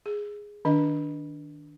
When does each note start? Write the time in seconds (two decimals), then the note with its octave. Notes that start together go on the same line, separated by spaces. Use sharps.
0.06 G#4
0.65 D#3 D4 D#5